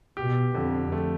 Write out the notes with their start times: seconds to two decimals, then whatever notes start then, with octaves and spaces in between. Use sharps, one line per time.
0.17 B2 G4
0.54 F2 D3
0.92 A3